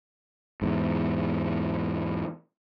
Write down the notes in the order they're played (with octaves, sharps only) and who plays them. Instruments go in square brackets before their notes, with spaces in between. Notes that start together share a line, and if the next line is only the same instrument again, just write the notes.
[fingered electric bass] E2 G#2